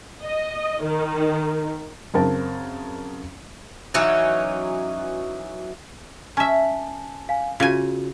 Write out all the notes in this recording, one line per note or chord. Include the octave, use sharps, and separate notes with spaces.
D#5
D#3
F#2 C#3 C4 A#4 A5
E3 F#3 C#4 D#4
C#4 E5 G#5 A5
F5 G#5
C#3 F4 F#4 G#5